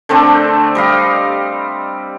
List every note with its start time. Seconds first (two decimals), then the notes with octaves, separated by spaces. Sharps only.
0.09 D3 A3 C4 D4
0.75 G3 D#5 F5